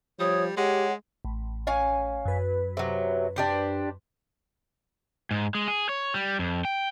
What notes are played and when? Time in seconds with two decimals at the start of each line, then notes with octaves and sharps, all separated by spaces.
0.20 F3 G3 C#5 D#6
0.57 G#3 G4 C#5 F#5
1.25 A1
1.67 C#4 F5 G#5
2.25 F#2 B4
2.77 C3 F#3
3.36 D4 G4 C5
5.31 G#2
5.55 G#3
5.68 G#4
5.89 C#5
6.14 G3
6.39 F2
6.65 G5